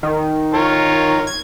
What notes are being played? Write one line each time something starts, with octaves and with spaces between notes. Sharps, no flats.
D#3
F4 A#4 C#5
G#6